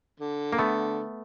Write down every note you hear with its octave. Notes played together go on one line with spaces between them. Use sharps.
D3
A#3
A3 B3